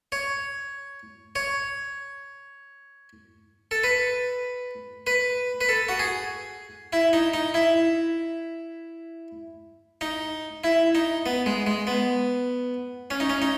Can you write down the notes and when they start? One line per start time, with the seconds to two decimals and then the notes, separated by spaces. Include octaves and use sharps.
0.12 C#5
1.36 C#5
3.71 A4
3.84 B4
5.07 B4
5.61 B4
5.69 A4
5.89 F#4
5.99 G#4
6.93 E4
7.13 D#4
7.34 D#4
7.54 E4
10.01 D#4
10.64 E4
10.95 D#4
11.26 B3
11.46 G#3
11.67 G#3
11.87 B3
13.11 C#4
13.20 D#4
13.30 C#4
13.42 D#4